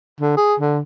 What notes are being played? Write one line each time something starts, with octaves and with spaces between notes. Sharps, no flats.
D3
G#4
D3